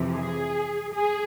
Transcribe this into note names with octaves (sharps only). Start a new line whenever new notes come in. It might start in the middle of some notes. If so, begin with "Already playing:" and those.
Already playing: F2 C3 E3
G#4
G#4